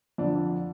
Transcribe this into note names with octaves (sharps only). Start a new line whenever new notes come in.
F2 D3 F3 D4